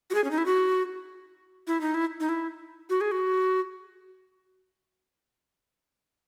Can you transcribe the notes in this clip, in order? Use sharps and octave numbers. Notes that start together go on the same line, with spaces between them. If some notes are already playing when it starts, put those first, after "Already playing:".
F#4
G#4
C#4
D#4
E4
F#4
E4
D#4
E4
D#4
E4
F#4
G#4
F#4